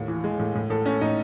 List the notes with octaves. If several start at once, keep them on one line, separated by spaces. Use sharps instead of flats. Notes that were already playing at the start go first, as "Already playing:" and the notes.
Already playing: D#2 A2
E3
G#3
A2
A2
A2 A4
A3 C#4
A2 D#4